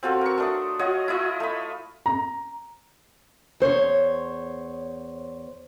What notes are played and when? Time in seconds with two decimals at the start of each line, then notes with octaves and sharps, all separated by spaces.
0.03 C4 F4 F#4 A4
0.21 A#4 C#6
0.38 A3 D4 D#6
0.79 F4 F#4 C#5 D#5
1.08 E4 F4 D#5
1.40 A3 B5
2.06 A#5
3.60 E2 C5 C#5